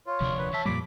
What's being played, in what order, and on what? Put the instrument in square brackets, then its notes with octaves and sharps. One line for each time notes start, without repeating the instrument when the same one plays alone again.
[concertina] F4 [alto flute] C#5
[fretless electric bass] E1 D2 C3 [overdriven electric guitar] F3 D4
[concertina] B4
[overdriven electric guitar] E3 A5 [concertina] E5
[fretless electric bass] F2 F3 G3 [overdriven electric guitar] A#2 [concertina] B5 D6